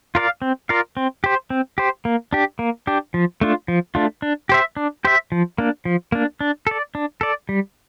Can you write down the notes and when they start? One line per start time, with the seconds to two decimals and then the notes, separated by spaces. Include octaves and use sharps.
0.15 F4 A#4 D5 F5
0.42 C4
0.69 F4 A#4 D5 F5
0.97 C4
1.24 G4 C5
1.50 C4
1.78 G4 C5
2.05 A#3
2.33 D4 G4
2.59 A#3
2.87 D4 G4
3.14 F3
3.41 A3 D4 F4
3.68 F3
3.95 A3 D4 F4
4.22 D4
4.49 G4 C5 E5
4.77 D4
5.05 G4 C5 E5
5.32 F3
5.58 A#3 D4
5.85 F3
6.12 A#3 D4
6.41 D4
6.67 A4 D5
6.95 D4
7.21 A4 D5
7.49 G3